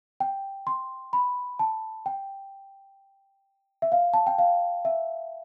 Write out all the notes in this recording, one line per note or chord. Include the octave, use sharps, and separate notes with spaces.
G5
C6
B5
A5
G5
E5
F5
A5
G5
F5
E5